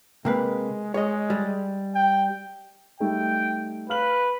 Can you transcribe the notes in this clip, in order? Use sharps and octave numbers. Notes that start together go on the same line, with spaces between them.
C3 G#3 A#3 B4
G#3 C#5 D#5
G3
G5
G3 A3 D#4 G5
B4 F5 F6 F#7